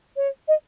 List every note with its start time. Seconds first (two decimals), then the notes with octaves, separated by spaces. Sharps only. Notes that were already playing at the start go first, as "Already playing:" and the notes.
0.16 C#5
0.48 D#5